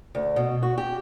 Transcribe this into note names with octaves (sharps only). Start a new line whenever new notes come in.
D2
B2
F#4
G4